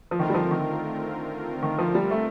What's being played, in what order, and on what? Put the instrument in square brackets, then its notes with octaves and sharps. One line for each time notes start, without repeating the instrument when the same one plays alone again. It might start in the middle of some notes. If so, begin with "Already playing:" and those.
[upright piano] F3
[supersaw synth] D3 A3 C4 F4 A#4 [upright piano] D#3
[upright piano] G3
F3
D#3
D#3
F3
G3
A3